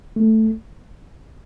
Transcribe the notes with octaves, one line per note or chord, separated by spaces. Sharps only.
A3